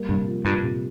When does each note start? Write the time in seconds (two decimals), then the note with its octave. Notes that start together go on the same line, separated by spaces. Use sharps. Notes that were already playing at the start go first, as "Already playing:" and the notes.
Already playing: G3 A#3
0.09 G2 C3
0.27 F3
0.45 G2 F4
0.63 C3